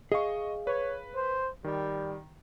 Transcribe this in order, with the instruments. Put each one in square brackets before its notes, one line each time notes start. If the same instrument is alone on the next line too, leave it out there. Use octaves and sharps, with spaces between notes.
[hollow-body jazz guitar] G#4 F5 [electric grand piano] D#5 C#6
[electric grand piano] B4 [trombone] C#5
[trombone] C5
[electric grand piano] D#3 [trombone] G3